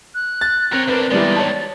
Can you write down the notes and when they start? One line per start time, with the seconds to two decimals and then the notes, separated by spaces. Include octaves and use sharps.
0.15 F#6
0.41 A6
0.73 C4 A#4 C#5
0.88 E2 D4 A#4 B4
1.11 D#3 E3 G3 G#3 B3 D5 A6
1.36 C#5 A5